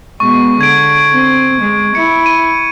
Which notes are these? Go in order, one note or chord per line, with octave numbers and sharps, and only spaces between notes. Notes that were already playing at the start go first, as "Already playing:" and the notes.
B2 G#3 C#6
D3 G#6 D7
C4
G#3
E4 C#7
D#7